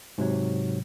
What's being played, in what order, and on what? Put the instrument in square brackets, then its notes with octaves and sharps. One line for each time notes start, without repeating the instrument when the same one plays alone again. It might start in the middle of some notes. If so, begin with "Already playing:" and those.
[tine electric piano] G#2 C3 F#3